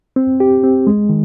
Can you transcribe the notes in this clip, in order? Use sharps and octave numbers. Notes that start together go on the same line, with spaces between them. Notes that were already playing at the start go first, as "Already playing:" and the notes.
C4
G4
C4
G#3
D#3